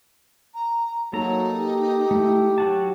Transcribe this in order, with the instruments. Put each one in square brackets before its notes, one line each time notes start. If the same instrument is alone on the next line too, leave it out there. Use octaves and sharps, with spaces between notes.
[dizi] A#5
[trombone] F#3 [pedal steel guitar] A#3 A4 A#5 [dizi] D#4
[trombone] G4
[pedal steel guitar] A3 E4
F#3 F#4 A5